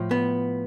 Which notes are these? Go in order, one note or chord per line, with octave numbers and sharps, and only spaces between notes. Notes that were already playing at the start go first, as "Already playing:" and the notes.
Already playing: A2 F3
B3